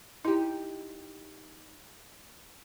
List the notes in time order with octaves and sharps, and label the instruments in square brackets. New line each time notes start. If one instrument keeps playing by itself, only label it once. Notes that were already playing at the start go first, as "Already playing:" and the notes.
[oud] D#4 G4 [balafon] E4